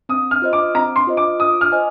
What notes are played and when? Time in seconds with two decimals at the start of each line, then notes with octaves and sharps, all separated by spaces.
0.09 C4 D#6
0.31 F6
0.42 F4 C5 D#5
0.53 D6
0.75 C4 A#5
0.96 C6
1.07 F4 C5 D#5
1.17 D6
1.39 F4 D#6
1.61 F6
1.72 C5 D#5 G#5